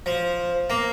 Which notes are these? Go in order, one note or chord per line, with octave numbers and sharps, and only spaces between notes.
F3
A#3